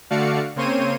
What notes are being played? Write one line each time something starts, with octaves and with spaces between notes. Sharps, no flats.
D3 A3 F#4 D5 F5 C#7
C#3 A#3 C4 C5 C#5 D#7